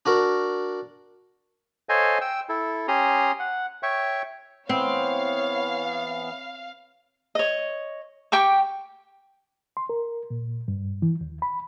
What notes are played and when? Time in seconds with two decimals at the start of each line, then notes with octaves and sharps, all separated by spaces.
0.06 D4 F#4 A#4
1.89 A4 C5 C#5 D#5 F5 G#5
2.21 G5 E6
2.49 E4 A4
2.88 C#4 G4 A#5 C6 D#6
3.39 F#5
3.83 C#5 E5 G5 C#6
4.69 E3 B3 C4 C#5 F5
7.35 C#5 D#5
8.32 G4 G5 C#6 D6
9.77 C6
9.89 A#4
10.30 A#2
10.68 G2
11.02 E3
11.21 D#2
11.42 B5